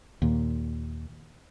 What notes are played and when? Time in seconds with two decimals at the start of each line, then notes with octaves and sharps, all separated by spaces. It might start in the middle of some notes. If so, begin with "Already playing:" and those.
0.22 D#2 A#2